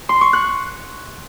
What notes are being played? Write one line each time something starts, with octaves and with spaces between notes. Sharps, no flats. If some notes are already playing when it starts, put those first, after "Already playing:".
C6
C#6
F#6